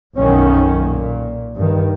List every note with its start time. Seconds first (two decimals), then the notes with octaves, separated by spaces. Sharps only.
0.17 B1 F#2 B2 D#3 C#4
0.79 A#2
1.57 G2 D#3